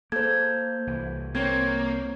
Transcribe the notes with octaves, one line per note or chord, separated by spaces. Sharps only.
A#3 A4 C5 G6 G#6
C2 E3
A#3 C4 C5 C#5 G#6